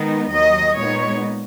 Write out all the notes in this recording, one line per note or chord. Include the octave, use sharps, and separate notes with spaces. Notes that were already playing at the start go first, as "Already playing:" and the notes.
Already playing: D#3 G#3 B3 D#4
D#2 D#3 F#3 D#5
A#2 G#3 B3 D#4 C#5